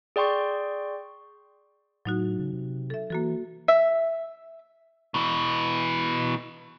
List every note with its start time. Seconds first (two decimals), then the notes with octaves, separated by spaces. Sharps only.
0.16 G#4 D5 G5 C6 C#6
2.05 A2 F#3 D#4 F#4
2.39 C#3
2.53 C3
2.90 A4 E5
3.10 E3 A#3 F#4 A4
3.68 E5
5.14 B2 E3